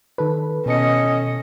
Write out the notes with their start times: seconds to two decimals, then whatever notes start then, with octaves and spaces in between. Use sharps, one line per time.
0.18 D#3 A4 B4
0.66 B2 C#4 A4 D#5 C#7